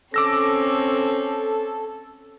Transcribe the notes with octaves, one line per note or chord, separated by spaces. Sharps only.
C4 C#4 A4 D6 E6 A#6